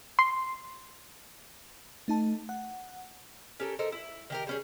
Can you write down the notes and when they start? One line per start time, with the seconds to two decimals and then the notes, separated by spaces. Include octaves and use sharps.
0.19 C6
2.08 A3 D#4 A5
2.49 F#5
3.60 C#4 G4 A4 A#4
3.79 A4 A#4 C5 D#5
3.92 E4
4.30 D#3 G4 A#4
4.47 G3 C#4 G#4